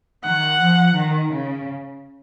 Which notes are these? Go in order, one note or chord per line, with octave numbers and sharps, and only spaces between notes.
D#3 F#5
F3
D#3
C#3